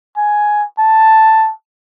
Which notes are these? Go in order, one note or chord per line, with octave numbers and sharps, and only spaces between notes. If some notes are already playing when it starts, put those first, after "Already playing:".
G#5
A5